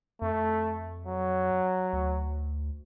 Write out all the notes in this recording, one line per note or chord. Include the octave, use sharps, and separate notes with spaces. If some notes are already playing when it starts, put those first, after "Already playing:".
F2 A3
F#3
D2